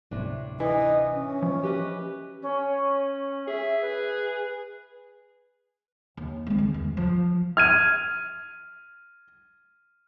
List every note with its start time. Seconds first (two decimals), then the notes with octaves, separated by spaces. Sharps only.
0.11 D1 A2 C3 D4
0.60 E3 D#5
1.13 C#4
1.42 F3
1.63 G4 B4 D#5
2.42 C#4
3.48 G#4 E5
3.81 B4
6.17 D#2
6.47 G#3 C4
6.58 D#3
6.74 E2
6.97 F3
7.57 F6 G#6 D#7